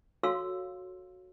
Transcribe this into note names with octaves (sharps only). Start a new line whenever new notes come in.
F#4 A4 C#5 F5 C6 E6